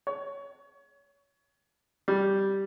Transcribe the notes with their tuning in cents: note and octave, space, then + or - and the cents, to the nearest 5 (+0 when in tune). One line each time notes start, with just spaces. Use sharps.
C#5 +25
G3 -5